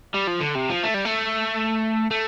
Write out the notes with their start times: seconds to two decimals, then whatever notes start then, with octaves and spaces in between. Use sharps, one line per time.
0.14 G3
0.27 F3
0.40 D3
0.55 C3
0.70 F3
0.83 A3
0.94 G3
1.05 A3
2.11 A3